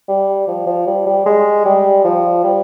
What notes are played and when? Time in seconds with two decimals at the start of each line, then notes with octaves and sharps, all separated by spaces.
0.08 G3
0.47 F3
0.66 F3
0.86 G3
1.06 G3
1.26 G#3
1.65 G3
2.04 F3
2.43 G3